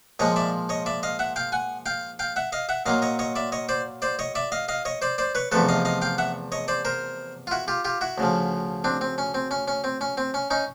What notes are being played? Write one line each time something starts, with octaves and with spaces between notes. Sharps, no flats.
A#2 F3 G#3 C#5 D#5
D5 E5
C#5 D#5
D5 E5
D#5 F5
E5 F#5
F5 G5
F#5 G#5
F5 G5
F5 G5
E5 F#5
D#5 F5
E5 F#5
A#2 F#3 A#3 D#5 F5
C#5 D#5
C#5 D#5
D5 E5
C#5 D#5
C5 D5
C5 D5
C#5 D#5
D5 E5
D#5 F5
D#5 F5
C#5 D#5
C5 D5
C5 D5
B4 C#5
E2 C3 F3 A3 A4 B4
D#5 F5
D#5 F5
F5 G5
E5 F#5
C#5 D#5
C5 D5
A#4 C5
F4
E4 F#4
F4 G4
F4 G4
E4 F#4
D2 C#3 F3
C4 D4
C4
C#4
C4
C#4
C#4
C4
C#4
C4
C#4
C#4 D#4